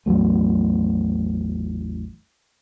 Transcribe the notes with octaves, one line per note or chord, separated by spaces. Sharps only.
A1 E2 F#3 A3